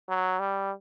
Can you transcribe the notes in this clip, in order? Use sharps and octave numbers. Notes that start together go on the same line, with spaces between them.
F#3
G3